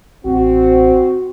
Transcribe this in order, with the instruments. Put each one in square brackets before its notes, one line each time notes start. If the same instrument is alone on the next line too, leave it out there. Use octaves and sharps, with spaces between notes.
[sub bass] A1 [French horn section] C4 F#4